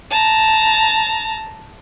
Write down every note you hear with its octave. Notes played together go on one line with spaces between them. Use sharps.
A5 A#5